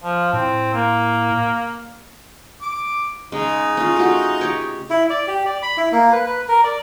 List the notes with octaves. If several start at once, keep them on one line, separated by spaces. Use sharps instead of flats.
F3
A2 C4
A#3
D6
C#3 G#3 D#4
C#4 F4
A3 F4 F#4
G4 C#5
E4
D5
G4
D5
B5
E4
A#3
B4
B4
A#4
D5